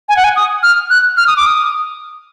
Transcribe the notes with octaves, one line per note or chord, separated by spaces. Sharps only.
G#5
F#5
G#5
D#6
F6
F#6
F6
D#6
D6
D#6